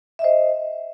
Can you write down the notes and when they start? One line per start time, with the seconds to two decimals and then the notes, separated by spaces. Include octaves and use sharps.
0.19 E5
0.22 D#5
0.24 C5